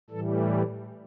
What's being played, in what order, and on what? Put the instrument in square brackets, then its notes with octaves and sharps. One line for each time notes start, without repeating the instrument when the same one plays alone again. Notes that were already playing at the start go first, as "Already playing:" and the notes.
[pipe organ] A2 E3 G3 A4